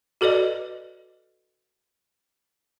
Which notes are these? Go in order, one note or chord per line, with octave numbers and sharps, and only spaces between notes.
F#4 A4 B4 D5 D#5